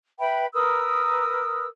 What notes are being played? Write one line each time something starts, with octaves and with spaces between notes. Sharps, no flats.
B4 E5 G5 B5
A#4 B4 D#6 E6